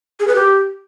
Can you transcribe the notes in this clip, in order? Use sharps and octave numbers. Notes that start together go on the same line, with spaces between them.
G#4
B4
G4